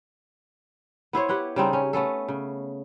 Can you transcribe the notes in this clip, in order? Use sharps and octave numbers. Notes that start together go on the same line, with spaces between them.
B3 E4 C5 C#5
G4 B4 F#5 G5
C#3 G3 C4 D#4
C#4
A3 B3 C#4 A4
C#3